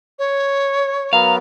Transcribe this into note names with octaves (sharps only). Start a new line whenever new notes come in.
C#5
F#3 B3 A#4 F5